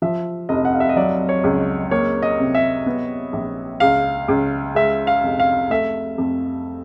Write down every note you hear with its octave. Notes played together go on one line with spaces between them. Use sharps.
F3 E5
F1 D#5
F#5
F5
E5
D#5
F#3 D5
C#5
C#2
A#3 C#5
D#5
C3
E5
B3
A#1
C#2 F5
C#2
G#3 E5
F5
F1
F5
A3 E5
F2